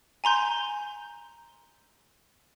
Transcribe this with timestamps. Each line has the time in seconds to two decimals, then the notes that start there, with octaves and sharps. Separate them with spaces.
0.24 G#5 A#5 C6 G6